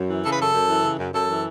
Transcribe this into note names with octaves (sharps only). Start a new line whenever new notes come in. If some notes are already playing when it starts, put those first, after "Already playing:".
Already playing: F#2
E3
C#3 A4
B4
F#2 A4
F#2
E3
C#3
F#2
F#2 A4
E3